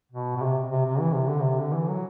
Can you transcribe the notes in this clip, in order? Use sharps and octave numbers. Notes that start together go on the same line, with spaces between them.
B2
B2
C3
C3
C3
E3
C3
D3
C3
D3
E3
F#3